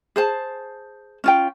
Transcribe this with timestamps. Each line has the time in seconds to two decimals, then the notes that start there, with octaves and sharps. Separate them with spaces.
0.16 G#4 C5 A5
1.24 C#4 F4 G5